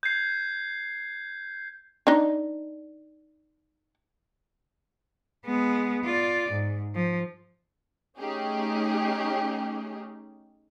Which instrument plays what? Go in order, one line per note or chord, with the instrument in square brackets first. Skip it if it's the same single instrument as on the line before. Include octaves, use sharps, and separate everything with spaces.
[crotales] G6 G#6 C7
[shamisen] D4 D#4
[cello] G#3 B3
F4 D5
G#2
F3
[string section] A3 C#4 D#4 G4 G#4